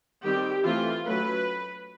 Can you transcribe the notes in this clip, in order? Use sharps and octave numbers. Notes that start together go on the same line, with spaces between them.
D#3 G3 C4 G4
E3 A3 C4 F4
F#3 A3 C#4 B4